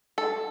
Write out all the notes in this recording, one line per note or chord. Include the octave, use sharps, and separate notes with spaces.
A4